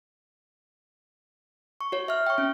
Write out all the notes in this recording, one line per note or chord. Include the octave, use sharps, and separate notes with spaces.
C#6
F#4 C#5
E5 F6
G5 C#6
C#4